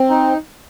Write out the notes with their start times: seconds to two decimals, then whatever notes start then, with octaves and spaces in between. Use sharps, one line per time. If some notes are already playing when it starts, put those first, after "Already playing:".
Already playing: C4
0.10 D#4